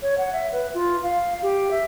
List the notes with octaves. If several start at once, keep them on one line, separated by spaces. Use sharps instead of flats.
C#5
F#5
E5
B4
F4
F5
G4
E5